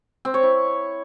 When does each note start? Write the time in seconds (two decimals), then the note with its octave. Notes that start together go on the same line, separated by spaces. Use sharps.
0.25 C4
0.34 C#5
0.43 E4